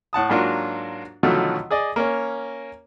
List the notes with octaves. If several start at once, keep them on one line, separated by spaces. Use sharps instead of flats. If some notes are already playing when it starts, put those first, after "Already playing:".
A2 F#5 A5 D#6
G#2 F#3 A#3 D4 F4 F#4
B2 D3 D#3 F3 F#3 A3
G#4 D5 D#5
A#3 C#4 C#5